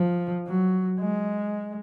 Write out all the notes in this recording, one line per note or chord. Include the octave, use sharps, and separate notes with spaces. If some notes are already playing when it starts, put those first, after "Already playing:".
Already playing: F3
F#3
G#3